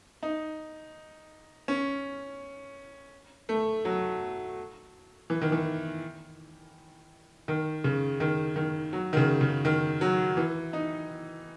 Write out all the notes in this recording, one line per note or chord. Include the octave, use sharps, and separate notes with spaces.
D#4
C#4
A3
F#3
E3
D#3
E3
D#3
C#3
D#3
D#3
F#3
D#3
C#3
C#3
D#3
F#3
E3
D#4